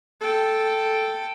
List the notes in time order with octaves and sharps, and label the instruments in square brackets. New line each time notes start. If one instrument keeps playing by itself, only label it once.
[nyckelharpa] A4 G5